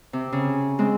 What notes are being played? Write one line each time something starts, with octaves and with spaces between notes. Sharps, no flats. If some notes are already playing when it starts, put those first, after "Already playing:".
C3
C#3
G#3 C4